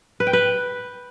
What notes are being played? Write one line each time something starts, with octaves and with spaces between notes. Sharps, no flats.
B4
G5
B4